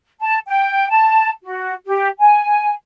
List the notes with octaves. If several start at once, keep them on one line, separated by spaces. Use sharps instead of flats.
A5
G5
A5
F#4
G4
G#5